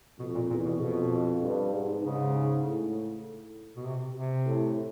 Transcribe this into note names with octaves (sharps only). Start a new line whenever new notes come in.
F2 B2
A#2
E2 A#2
B2
F2 B2
G2
G#2
G#2 C#3
A2
B2
C3
C3
A2